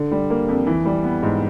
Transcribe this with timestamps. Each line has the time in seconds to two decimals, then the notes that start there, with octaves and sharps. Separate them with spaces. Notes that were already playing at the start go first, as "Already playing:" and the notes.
Already playing: D3
0.11 G3
0.30 A#3
0.49 F2
0.67 E3
0.86 G3
1.04 B3
1.23 G#2